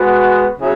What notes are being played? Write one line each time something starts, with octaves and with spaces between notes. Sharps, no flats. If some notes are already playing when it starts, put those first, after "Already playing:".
Already playing: G#3 B3 F#4
C#3 F#3 B3 E4 G#4